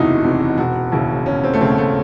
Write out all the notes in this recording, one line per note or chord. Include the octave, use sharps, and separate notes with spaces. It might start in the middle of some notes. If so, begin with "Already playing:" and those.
Already playing: F#1 E2 C3 E3 A3 D#4 E4 F#4
E2 C3 E3
E1 F#4
D#2 C#3 E4
E1 C#4
C4
A3
D#2 C#3 C4
A3